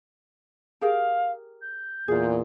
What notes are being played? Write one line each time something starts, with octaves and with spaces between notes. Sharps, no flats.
G4 G#4 A#4 F5
G6
E2 A#2 F4 G#4